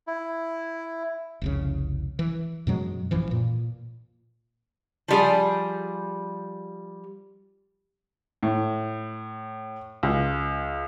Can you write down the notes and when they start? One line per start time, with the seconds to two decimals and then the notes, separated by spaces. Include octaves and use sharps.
0.07 E4
1.42 F1 C2 C#3
2.19 E3
2.67 F#2 B2 F#3 G#3
3.11 A1 F#2 E3 F3
3.31 A#2
5.08 F3 G3 G#4
8.43 A2
10.03 C#2